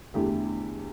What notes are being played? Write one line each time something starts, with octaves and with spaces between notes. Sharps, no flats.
E2 D3 A3 E4 G4